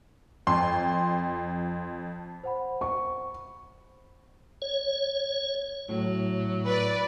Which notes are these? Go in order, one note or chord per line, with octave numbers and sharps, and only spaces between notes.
F2 C6
C5 F#5 B5
C#6
C#5
A2 F#3
B4 D5